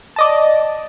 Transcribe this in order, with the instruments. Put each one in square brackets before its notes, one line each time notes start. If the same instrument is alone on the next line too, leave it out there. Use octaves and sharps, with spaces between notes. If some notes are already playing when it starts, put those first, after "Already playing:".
[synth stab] D5 D#5 A5